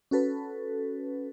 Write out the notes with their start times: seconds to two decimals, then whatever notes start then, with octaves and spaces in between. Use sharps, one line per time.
0.11 C#4 F#4 A4 B4